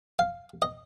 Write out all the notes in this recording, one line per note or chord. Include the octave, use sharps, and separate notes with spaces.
F5
D#5